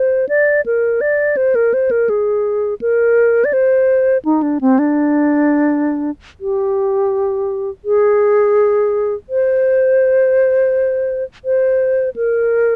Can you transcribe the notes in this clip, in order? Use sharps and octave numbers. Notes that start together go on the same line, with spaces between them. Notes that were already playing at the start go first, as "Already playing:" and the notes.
Already playing: C5
D5
A#4
D5
C5
A#4
C5
A#4
G#4
A#4
D5
C5
D#4
D4
C4
D4
G4
G#4
C5
C5
A#4